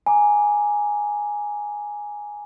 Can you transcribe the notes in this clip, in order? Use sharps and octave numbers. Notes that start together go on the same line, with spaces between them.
G#5 A#5 D6